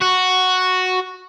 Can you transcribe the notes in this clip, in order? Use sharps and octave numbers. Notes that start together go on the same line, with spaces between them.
F#4